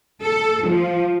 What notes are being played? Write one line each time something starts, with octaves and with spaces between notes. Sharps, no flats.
A4
F3